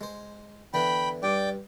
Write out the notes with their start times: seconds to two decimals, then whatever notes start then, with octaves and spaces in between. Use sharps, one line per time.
0.01 G#3 C5
0.74 D3 E3 B3 G5 B5
1.23 G2 D5 G5 D6